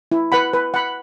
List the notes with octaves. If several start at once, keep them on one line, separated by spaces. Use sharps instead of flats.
E4
B4 F#5 B5
B4
F#5 B5